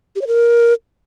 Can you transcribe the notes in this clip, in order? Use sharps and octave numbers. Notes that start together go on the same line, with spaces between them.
G4
C#5
A#4